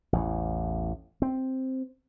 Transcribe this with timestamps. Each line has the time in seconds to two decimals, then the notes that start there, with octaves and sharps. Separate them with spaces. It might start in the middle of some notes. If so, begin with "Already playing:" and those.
0.13 A1 E2
1.22 C4